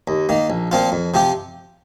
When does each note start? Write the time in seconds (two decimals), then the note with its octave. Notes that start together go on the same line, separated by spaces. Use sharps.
0.08 D#2
0.29 D#3 A#3
0.50 A#1
0.71 A#2 F3 C4 F4
0.92 F2
1.14 C3 F3 C4 G4